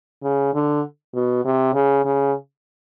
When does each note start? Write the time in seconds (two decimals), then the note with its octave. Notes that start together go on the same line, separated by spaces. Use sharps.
0.23 C#3
0.54 D3
1.14 B2
1.45 C3
1.73 C#3
2.05 C#3